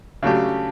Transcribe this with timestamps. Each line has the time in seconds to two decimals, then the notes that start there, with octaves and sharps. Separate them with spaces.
0.23 C#3 F#3 A3 D4 G4